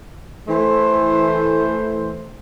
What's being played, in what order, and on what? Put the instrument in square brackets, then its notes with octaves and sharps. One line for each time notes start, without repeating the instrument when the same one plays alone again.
[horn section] E3 A3 C5